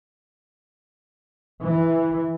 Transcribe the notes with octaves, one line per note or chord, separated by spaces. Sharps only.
E3